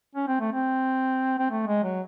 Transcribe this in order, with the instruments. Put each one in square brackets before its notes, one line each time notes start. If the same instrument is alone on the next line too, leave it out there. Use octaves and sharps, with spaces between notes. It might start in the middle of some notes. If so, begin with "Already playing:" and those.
[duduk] C#4
C4
A3
C4
C4
A3
G#3
F#3